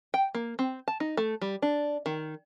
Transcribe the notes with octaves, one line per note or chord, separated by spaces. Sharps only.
G5
A#3
C4
A5
D#4
A3
G3
D4
D#3